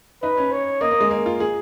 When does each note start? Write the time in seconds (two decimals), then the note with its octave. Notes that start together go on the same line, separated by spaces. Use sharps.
0.22 D#4 B4
0.37 C#4
0.52 C#5
0.81 A#3 D#5
0.91 A#3
1.00 G#3
1.11 A#3
1.26 F4
1.40 G#4